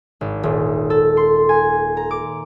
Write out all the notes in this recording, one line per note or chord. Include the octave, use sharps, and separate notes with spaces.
G#1
D#1
A4
C6
G#5
A#5
D6